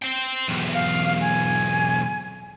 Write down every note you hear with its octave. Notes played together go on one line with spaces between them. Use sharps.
C5 G5
B1 E2
F5
G#5